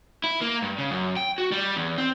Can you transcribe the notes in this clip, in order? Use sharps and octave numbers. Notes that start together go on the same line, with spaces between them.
E4
A#3
G2
C#3
F#2
G5
F#4
G3
E2
C4